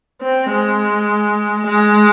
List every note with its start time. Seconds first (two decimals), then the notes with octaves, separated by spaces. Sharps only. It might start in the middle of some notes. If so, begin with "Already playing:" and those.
0.22 C4
0.51 G#3
1.68 G#3